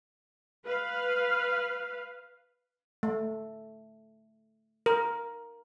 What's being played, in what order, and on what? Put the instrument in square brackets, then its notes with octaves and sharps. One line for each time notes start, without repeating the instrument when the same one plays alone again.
[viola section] B4 F5
[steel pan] A3
A#4